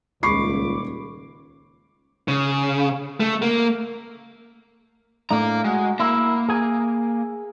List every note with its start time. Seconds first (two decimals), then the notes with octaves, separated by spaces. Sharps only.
0.23 D#1 C#2 B5 C#6 D6 C7
2.28 C#3
3.20 A3
3.42 A#3
5.30 A2 A3 D4 F5 A#5
5.64 G#3 F#4
6.00 A#3 E4
6.49 G#4 G#5